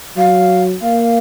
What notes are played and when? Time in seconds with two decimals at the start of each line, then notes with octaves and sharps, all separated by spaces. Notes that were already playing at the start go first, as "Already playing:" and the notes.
0.17 F#3 F5
0.82 A#3 F5